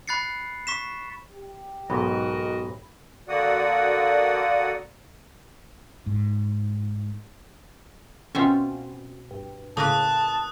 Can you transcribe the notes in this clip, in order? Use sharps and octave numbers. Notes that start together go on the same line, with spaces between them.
B5 F#6 A6 C7 C#7
C#6 B6 E7
G4
B1 G#2 F#4 A#4 D#5 B5
D3 A#3 F#4 D5 F#5 D#6
G#2
B2 C4 C#4 F4 E5
G2
A2 C#3 A#3 A#4 B4 A5 D#6 F#6